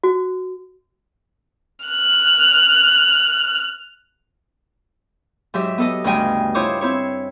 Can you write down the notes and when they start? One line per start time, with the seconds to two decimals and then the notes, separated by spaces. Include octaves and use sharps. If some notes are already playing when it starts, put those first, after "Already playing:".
0.04 F#4
1.86 F6 F#6
5.54 G#2 F#3 G4 E5
5.78 B3 A4 D#5
6.04 D2 G2 C#3 D#5 G5 G#5
6.55 E4 F4 C5 C#5 D6 D#6
6.81 C4 E4 C#5